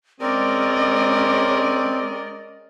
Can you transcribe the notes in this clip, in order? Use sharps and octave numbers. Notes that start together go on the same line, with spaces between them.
G#3 C4 C#4 A#4 D5 D#5